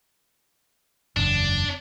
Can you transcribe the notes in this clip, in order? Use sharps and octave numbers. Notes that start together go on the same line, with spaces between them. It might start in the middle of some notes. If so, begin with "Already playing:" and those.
F#1 E2 D4